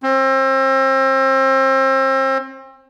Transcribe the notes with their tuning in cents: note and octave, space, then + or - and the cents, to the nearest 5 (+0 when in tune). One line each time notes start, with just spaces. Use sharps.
C4 +35